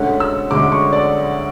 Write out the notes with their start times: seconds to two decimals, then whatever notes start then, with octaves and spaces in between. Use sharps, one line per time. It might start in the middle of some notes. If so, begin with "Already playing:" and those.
Already playing: D2 D3 G#3 C#4 F#5
0.20 E6
0.51 D2 D3 G#3 C#4 D6
0.72 C#6
0.93 D5